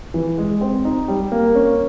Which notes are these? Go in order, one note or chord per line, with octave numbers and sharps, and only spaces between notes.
E3
G#3
C4
D#4
G3
A#3
C#4